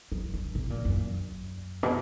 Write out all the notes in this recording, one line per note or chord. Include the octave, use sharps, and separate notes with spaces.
F#3
F#3
A#2
B2
A#2
F#2
B2